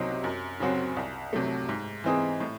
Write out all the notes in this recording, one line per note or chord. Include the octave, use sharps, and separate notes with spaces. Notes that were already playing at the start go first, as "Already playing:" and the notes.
Already playing: C2 C3 F#3 C4 D#4
F#2
C#3 F#3 C4 F#4
C2
C3 F#3 A3
G#2
E3 C4 D#4 G#4
A2